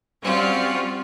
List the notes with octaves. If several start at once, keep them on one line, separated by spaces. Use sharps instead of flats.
G3 C4 C#4 F4 F#4